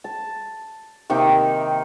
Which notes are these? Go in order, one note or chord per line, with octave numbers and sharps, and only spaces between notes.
A5
C3 D#3 A#3 D#4